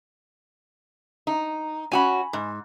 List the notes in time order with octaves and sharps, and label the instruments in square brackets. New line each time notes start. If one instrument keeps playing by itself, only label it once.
[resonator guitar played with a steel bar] D#4
[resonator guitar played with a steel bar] C#4 F#4 [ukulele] G#5 B5
[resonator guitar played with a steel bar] G#2